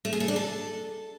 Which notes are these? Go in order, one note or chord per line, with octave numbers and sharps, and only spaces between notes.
A3
G#4
A4
D4
A4